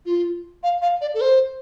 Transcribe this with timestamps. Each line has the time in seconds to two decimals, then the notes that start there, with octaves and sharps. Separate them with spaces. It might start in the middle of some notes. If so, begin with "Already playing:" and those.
0.06 F4
0.63 F5
0.82 F5
1.01 D5
1.14 A4
1.21 C5